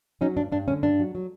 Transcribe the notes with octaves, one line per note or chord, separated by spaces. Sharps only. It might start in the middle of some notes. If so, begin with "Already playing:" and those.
F#3 C#4 D#4
G2 D4
G2 D4
D3 C#4
G2 D4
F#3
F#3